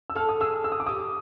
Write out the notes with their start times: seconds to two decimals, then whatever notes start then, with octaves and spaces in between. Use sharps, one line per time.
0.10 E6
0.15 A4 F6
0.29 D#6
0.40 G#4 E6
0.64 E6
0.72 D#6
0.80 D6
0.86 G4 D#6